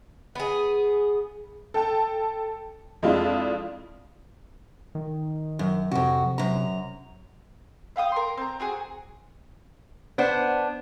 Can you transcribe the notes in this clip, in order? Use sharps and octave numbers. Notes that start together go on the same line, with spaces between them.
B3 G#4
A4 G5 A5
F2 G#3 D4 E4 F4
D#3
F#2
F2 C3 F#4
F#2 A#5
E5 F5 G5 D#6
A#4 C6
C4 A#5
C4 F#4 G#4
B3 D4 C5